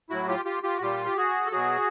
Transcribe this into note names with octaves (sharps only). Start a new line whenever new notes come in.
A2 F#3 E4 F#4
F4 G4
F4 G4
F4 G4
F#4
A#2 G3 F4 G4
G4
F#4 G#4
A4
B2 F#3 F#4 G#4